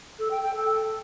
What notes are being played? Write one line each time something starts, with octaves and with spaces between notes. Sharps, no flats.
A4
G5
G5
A4